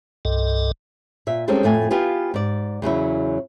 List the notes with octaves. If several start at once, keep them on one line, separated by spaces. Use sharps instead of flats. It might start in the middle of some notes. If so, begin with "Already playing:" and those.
C2 G2 A4 D#5
A#2 E5
G3 G#3 C4 C#4 D#4 A4
F2 A2 A3 G#5
B3 F4 G4 F5 G#5
G#2 D5
E2 C#3 F#3 E4